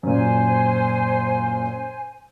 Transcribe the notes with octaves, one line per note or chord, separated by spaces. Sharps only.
F#2 A#2 C5 G#5